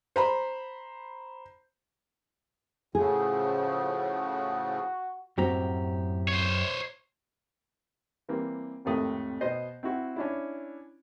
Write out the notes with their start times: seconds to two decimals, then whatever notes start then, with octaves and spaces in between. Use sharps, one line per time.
0.16 C5 A#5 B5
2.95 A2 C#3 F3 F#4 G#4
5.38 F#2 A2 C4 F#4 G4 A#5
6.28 C5 C#5
8.29 E3 G3 A#3 C4
8.85 G#1 F2 A2 C3 A3 D#6
9.41 B2 C5 D#5 C6
9.83 C4 E4 F#4
10.16 C#4 D4 E4